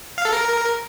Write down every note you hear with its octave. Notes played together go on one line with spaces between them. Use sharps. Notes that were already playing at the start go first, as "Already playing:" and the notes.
F5
A4
A#4